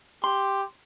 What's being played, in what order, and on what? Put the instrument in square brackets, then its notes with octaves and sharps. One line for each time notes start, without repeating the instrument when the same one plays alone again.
[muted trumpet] G4 [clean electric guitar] C6